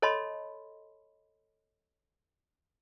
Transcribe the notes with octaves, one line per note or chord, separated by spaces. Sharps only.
A4 C#5 D#5 A5 B5 C6